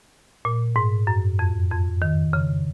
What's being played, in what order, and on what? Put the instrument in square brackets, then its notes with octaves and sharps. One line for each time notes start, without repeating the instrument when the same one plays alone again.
[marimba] A#2
G#2
F#2
F2
F2
D#3
C#3